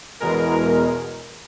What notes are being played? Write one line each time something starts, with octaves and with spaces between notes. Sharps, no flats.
E2 B2 G#3 A#4